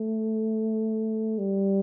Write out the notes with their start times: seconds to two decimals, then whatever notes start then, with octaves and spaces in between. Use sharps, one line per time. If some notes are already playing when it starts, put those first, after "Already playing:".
Already playing: A3
1.39 G3